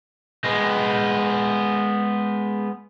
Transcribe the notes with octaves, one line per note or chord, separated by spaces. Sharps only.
G#3 B3